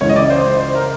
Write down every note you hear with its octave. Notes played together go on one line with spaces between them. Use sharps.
C#2 C#3 E3 C#5
D#5
D5
C5
C5
C5
A#4